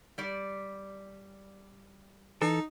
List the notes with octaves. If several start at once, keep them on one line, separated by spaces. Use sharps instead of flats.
G3 D5
E3 D#4 A4